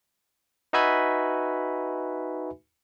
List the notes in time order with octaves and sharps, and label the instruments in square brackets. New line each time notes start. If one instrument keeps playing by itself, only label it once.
[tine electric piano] D#4 F#4 B4 E5 G#5 B5